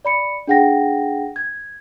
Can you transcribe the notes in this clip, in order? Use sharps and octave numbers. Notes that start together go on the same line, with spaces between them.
D5 B5 C#7
D4 G#4 F#5 G5 A#6
G#6